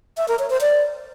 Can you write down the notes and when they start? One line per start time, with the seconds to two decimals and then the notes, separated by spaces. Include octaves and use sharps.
0.17 E5
0.28 A#4
0.39 C#5
0.50 C5
0.61 D5